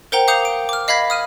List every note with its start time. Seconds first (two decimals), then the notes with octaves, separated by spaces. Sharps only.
0.12 A#4 C5 F#5 G5 A#5 G7
0.28 F5 D6 D#6 G6 C#7 F7
0.45 D7
0.69 D6 F6
0.88 D#5 F5 B5 G#6 B6
1.10 D#6 F6 D#7